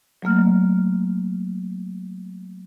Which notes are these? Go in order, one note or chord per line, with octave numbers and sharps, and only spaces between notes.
F#3 A3 A#3 F6